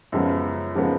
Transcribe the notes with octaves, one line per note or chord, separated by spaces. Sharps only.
F#2 C#3 F3 G#3 B3
C#3 F3 G#3 B3